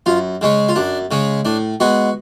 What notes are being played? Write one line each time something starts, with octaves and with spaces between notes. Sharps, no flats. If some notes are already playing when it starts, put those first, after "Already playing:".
F#2 F4
C#3 G#3 C#4
F4
F#2 D4
C#3 G#3 C#4
A2 D4
G#3 B3 F#4